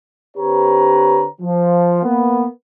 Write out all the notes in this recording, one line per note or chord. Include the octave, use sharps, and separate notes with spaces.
D3 C4 G4 B4 C#5 A#5
F3
A#3 B3